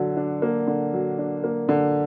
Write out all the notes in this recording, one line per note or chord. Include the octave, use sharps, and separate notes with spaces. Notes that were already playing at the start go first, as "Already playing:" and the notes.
Already playing: D3 F#3
D4
A#3
D3
F#3
D4
A#3
D3